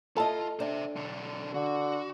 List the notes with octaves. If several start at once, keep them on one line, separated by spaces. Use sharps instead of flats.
E4 F4 A4 D#5 A5
D4 C5 E5
B1 D3
D3 F#4